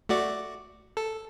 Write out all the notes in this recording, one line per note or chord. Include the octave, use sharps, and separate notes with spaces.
A3 F#4 D5
A4